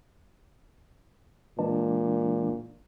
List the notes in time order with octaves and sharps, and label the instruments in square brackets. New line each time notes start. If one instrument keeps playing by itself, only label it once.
[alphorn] A#2 [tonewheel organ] E3 G#3 D4